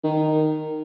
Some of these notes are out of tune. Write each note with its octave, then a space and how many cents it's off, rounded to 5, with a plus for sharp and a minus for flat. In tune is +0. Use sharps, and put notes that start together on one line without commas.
D#3 -10